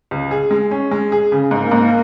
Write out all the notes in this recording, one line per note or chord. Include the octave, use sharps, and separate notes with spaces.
C#2
G#4
G#3
C#4
G#3
G#4
C#3
G#2 A#3
G#2